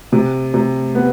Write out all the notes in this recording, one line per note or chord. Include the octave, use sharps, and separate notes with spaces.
C3
C3
B3